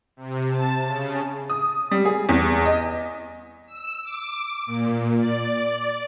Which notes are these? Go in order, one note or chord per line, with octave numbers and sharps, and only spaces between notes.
C3
A5
C#3
D#6
G3
G#4
E2
D#5
E6
D6
A#2
D5